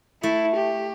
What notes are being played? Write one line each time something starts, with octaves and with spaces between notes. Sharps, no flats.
A3 E4
G4